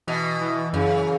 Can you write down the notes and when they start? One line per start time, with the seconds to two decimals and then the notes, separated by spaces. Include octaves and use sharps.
0.08 B2 E3
0.41 E3
0.73 F#2 C#3